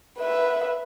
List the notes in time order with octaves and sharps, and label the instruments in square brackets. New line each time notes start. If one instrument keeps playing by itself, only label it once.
[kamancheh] B4 E5